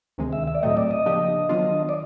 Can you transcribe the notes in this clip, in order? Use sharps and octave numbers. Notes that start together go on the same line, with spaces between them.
D2 C3 D#3 G#3
E5
E5
D5
A2 F#3 A3 C4 D#5
D5
D#5
C#3 F3 A#3 D4 G4
D#3 F#3 B3 D4 F4
D5